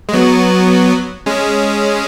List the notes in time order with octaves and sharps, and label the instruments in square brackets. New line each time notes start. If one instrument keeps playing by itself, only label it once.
[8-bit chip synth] G#3
F#3 B3
G#3 C#4